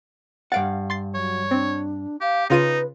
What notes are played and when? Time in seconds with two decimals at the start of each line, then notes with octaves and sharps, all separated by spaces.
0.52 G2 F5 F#5 A6 D7
0.90 C6 A6 C7
1.15 F#3 C#5
1.51 C4 D4
2.21 G4 F5
2.50 C#3 D#4 F4 B4 D#7